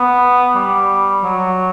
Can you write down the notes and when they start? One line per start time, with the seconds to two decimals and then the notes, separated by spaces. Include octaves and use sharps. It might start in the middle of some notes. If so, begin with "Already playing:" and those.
Already playing: B3
0.55 G3
1.23 F#3